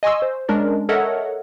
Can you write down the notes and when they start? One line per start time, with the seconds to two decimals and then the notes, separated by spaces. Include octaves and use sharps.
0.03 D#5 G#5 C6 C#6 E6
0.22 C5
0.49 G#3 C#4 D4 A#4 D5
0.89 A4 A#4 C#5 D#5 E5 F#5